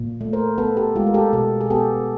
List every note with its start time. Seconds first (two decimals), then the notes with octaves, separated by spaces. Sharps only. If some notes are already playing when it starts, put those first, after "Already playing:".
Already playing: A#2
0.21 A3
0.33 A#4 C5
0.58 B3 A4 B4
0.77 G4 A4
0.96 G#3 F4 G4
1.07 A#4
1.14 G4 A4
1.33 B2 G4 A4
1.61 G#4
1.70 B3 G4 A4